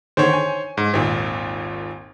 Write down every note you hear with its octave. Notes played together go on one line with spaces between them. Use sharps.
E2 D3 D#3 C5 C#5
G#5
G#2
G#1 D#2 A#2